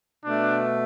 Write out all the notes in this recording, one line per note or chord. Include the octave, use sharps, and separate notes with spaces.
B2 A3 D4